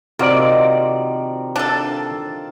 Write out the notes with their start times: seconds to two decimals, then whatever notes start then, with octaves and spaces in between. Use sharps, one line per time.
0.19 C3 D#3 F3 A#3 F#4 D5
1.56 D4 A4 F5